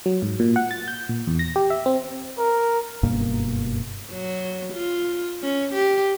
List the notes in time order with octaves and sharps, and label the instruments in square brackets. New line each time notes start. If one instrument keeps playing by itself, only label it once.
[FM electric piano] F#3
G#2
A#2
F#5
A6
G6
A#2
E2
A#6
G4
E5
C4
[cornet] A#4
[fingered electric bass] F#1 G2 B2 A#3
[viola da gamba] F#3
F4
C#4
G4